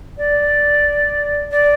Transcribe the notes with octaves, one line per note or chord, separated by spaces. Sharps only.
D5
D5